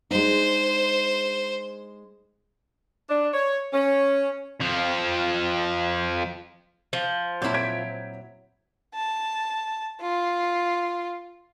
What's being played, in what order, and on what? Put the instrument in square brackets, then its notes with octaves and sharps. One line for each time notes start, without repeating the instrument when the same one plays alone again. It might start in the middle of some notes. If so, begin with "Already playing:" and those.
[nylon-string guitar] G#3 D4 D#4 [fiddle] C5
[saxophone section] D4
C#5
C#4
[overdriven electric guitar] F2 F3
[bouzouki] F3
[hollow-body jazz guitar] A#2 C4 A5 [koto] F#3 E4 [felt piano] G6
[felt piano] G#6 B6 D7
[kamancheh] A5
F4